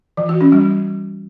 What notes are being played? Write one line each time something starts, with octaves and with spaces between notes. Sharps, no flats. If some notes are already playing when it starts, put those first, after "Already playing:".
E3
F#4
C#4
G3